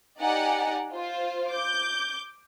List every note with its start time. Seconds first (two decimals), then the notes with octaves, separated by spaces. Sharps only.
0.20 D#4 G4 D5 F#5 G#5 A#5
0.93 F4 C5
1.49 D6 G6